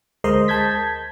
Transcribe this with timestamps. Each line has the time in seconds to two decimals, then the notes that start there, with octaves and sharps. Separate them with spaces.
0.24 D2 G#3 A#4 C5 D#5 C6
0.48 A5 G6 G#6 B6